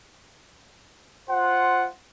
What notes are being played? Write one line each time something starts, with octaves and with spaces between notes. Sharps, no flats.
F4 C5 F#5